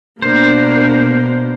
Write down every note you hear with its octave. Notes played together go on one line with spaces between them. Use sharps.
B2 A#3 D4 A#4 C5